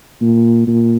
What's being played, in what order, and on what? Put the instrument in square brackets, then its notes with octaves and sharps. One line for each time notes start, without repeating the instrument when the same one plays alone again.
[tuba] A#2
A#2